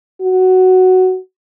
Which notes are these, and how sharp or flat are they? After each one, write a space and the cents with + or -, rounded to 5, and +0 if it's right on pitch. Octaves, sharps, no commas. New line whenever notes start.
F#4 +5